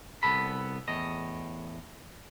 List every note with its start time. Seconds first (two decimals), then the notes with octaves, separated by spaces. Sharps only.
0.23 C2 B3 A4 B5
0.88 E2 A2 D#5